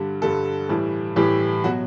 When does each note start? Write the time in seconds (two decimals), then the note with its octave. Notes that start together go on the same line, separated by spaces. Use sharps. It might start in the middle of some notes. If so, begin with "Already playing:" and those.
Already playing: G2 D3 G3
0.22 G2 D3 G3 A4
0.69 A2 E3 G3
1.16 A2 E3 G3 G4
1.64 B2 F#3 F#4